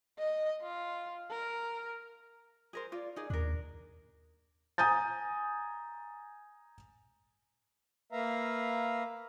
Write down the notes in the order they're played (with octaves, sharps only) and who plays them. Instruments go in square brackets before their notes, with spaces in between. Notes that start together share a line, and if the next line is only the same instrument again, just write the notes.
[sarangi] D#5
F4
A#4
[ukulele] G#4 A#4 C5
F4 D5
D#4 G#4 D5
[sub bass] D#2 [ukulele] D4 A#4
[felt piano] G#5 A#5 D#6 G6 A6
[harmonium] A#3 B4 E5 F5 A#5